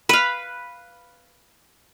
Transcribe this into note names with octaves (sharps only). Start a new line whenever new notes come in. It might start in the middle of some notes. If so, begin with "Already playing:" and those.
B4 F5